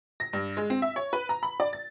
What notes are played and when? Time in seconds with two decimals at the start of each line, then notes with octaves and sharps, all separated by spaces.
0.20 A#6
0.33 G2
0.57 G#3
0.70 C4
0.82 E5
0.96 C#5
1.13 B4
1.29 A#5
1.43 B5
1.60 D5
1.73 A6